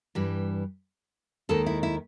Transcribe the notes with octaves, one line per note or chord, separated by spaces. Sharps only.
G2 E3 G3
D#2 D#3 G#3 A4
E4
E4